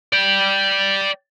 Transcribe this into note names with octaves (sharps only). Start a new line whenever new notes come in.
D5 G5